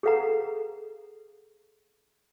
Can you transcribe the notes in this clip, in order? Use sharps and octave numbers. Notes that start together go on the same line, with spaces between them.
G#4 A4 B4 F5 F#5 A#5